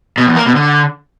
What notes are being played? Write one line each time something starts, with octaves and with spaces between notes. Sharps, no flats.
B2
E2
A#3
B2
D3